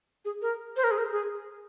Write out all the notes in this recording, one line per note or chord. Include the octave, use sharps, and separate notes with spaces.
G#4
A#4
C5
A#4
G#4
A#4
G#4